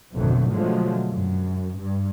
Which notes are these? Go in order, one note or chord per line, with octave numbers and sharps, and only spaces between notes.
G#1 F2 B2 D3 F#3 A3
B2 D3 F3 F#3 G#3 A3
F#2
G2